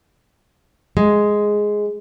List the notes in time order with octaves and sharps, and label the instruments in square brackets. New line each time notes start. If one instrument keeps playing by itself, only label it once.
[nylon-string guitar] G#3